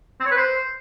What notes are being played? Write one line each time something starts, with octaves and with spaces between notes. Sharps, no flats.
C4
C#5
B4
C5